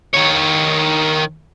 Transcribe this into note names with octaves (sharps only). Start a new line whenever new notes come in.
D#3 C#5